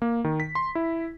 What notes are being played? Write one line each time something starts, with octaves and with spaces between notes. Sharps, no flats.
A#3
D#3
B6
C6
E4